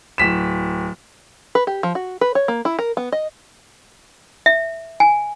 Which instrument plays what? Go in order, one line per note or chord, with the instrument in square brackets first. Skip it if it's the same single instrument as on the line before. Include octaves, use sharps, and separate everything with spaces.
[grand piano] D1 B6 E7
[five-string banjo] B4
G4
F3
F#4
B4
C#5
A#3
E4
A#4
B3
D#5
[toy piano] E5
G#5